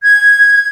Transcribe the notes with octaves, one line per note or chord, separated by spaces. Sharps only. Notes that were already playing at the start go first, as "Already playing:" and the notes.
G#6